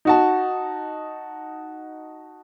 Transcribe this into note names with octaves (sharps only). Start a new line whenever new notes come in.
D#4 F#4 A5